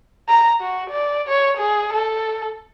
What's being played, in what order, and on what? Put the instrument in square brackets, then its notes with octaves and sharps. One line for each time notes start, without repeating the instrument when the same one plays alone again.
[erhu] A#5
F#4
D5
C#5
G#4
A4